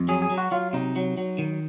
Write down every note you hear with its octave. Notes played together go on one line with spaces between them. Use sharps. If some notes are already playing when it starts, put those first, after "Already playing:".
Already playing: F2
F#3 G#4
G#4
F#3
F#4
F#3 F4
C3 D#4
F#3
F#3
D#3